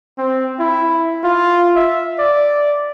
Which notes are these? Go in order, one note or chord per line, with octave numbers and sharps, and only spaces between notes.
C4
E4
F4
E5
D5